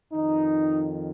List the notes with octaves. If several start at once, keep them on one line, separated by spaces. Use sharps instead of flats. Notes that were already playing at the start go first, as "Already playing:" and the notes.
F2 D#3 D#4